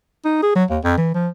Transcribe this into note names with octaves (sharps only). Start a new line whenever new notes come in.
D#4
G#4
F#3
D#2
F2
E3
F3